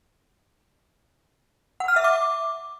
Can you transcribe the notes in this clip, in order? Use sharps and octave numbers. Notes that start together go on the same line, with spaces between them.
F#5
F6
E5
D6